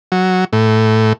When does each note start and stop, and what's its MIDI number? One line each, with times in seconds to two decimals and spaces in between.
0.12 0.45 54
0.53 1.13 45